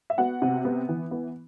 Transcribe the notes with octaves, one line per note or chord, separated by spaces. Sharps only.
E5
B3 F#4 F#5
C3
B3
E3
B3